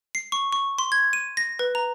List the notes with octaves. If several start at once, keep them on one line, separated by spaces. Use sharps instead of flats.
C7
C#6
C#6
C6
G#6
D#7
A#6
B4
A#5